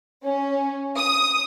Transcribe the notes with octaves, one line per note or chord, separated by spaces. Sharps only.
C#4
D#6